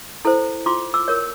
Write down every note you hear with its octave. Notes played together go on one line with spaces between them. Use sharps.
E4 A4 C5
F4 C6 D6
D6 E6
A#4 C#5